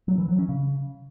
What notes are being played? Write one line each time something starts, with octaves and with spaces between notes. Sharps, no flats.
F#3
E3
F#3
C#4
C#3